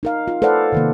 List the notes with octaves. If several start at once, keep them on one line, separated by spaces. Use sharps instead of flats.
D#4 A#4 F5
F4
A4 B4 C5 D5 F5 F#5
C3 D#3 A#3